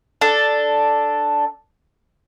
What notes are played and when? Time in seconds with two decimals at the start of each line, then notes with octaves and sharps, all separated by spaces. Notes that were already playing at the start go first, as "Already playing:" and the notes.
0.21 D4 A4